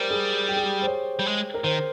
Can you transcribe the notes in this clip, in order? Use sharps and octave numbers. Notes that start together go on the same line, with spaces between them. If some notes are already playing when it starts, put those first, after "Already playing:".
Already playing: G3 A#4 C5
G#4
G4
G#4
G4
C5
C#5
G3
G#3
A#4
D#3 C5